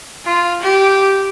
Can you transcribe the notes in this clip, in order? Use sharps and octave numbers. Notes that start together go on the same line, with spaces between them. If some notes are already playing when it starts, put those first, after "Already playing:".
F4
G4